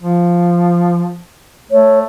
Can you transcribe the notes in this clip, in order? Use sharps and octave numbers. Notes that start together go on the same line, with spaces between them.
F3
A3 C#5